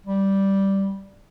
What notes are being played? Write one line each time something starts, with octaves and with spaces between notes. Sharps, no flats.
G3